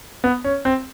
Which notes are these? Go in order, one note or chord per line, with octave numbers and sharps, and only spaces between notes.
B3
C#4
C4